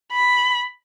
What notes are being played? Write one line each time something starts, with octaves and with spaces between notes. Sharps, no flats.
B5